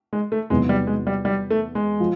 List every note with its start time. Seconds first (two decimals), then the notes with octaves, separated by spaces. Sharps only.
0.13 G#3
0.32 A3
0.50 E2 C3 D#3 F#3 G#3 B3
0.69 G3
0.87 G#3
1.07 G3
1.25 G3
1.51 A3
1.75 G#3
2.00 F3